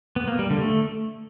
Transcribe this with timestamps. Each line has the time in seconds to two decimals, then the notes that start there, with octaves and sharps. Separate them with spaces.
0.16 B3
0.28 A#3
0.39 G3
0.50 D3
0.61 A3